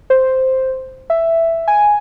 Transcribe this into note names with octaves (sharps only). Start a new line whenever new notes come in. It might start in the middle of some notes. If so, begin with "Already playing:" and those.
C5
E5
G#5